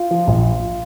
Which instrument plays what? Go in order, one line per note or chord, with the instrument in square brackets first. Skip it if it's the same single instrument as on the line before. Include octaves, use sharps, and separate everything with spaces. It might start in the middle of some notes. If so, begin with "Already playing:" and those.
Already playing: [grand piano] F4
F3
A#1